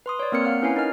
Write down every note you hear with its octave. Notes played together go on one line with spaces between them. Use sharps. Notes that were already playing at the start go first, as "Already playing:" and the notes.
B4 C6 D#6
C#5 D5
A#3 C4 A#4 F6 C#7
F5 F#5 F6
C#4 E4 B4 C#5 G#5 C7
D#4 A#4 D#5 F6